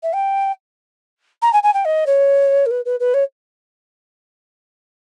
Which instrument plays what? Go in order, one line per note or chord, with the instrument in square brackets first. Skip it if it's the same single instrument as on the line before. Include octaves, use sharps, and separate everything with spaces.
[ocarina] E5
G5
A#5
G#5
G#5
G5
D#5
C#5
A#4
B4
B4
B4
C#5